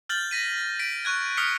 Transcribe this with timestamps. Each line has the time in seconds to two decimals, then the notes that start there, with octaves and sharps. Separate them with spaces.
0.09 F6 G6 A6 F#7
0.31 A#6 B6 D#7
0.79 B6 D7
1.05 C#6 F#6 G#6
1.37 D#6 F6 B6 C#7